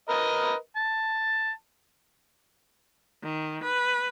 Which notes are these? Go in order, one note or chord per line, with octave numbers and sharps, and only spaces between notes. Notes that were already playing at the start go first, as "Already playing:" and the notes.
A#4 B4 D#5
A5
D#3
B4